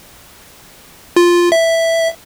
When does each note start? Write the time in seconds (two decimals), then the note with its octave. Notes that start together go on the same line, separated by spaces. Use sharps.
1.16 F4
1.52 E5